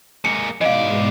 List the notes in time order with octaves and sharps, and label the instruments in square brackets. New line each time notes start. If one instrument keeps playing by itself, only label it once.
[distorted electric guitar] G#3 A#3 [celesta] C#7
[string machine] G#2 B2 G#3 [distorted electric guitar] E3 D5 [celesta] D#5 F5